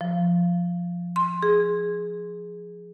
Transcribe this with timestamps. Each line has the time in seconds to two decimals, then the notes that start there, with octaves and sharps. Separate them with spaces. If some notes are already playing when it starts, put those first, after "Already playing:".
0.01 F3
1.16 C6
1.43 G#4